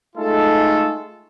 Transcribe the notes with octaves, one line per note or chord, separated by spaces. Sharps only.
G#3 A3 D#4 F4 A4